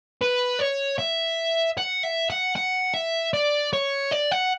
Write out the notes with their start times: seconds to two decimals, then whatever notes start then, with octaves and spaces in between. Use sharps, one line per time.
0.22 B4
0.60 C#5
0.99 E5
1.78 F#5
2.03 E5
2.30 F#5
2.56 F#5
2.94 E5
3.33 D5
3.73 C#5
4.11 D5
4.31 F#5